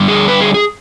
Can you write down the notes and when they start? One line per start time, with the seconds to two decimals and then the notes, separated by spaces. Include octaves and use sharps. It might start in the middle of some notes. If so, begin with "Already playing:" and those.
Already playing: D3 G3
0.08 G#4
0.28 B4
0.41 G#4
0.54 G#4